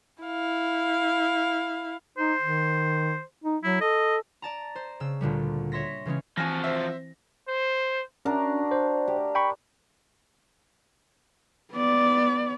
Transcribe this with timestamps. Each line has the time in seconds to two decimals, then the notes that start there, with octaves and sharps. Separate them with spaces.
0.23 E4 F5
2.18 D#4 C5
2.41 D#3
3.44 D#4
3.64 F#3 E4
3.81 A4 D#5
4.42 D5 A5 A#5
4.76 C5
5.00 C#3 E6
5.21 D2 A#2 D3 G3
5.72 C#5 E5 C6 A#6 B6
6.06 C#3 E3 G#3 C#4
6.38 E3 F3 C4 F#4 G#5 A#6
6.64 C5 E5
7.48 C5
8.25 C#4 D4 F#4 A#4
8.71 C5
9.08 G4
9.35 G5 B5 C#6
11.72 B3 D5